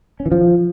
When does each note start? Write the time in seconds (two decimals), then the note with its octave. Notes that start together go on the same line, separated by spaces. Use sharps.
0.20 C#4
0.26 E3
0.32 F3